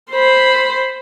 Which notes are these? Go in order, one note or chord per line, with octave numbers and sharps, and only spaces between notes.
C5 B5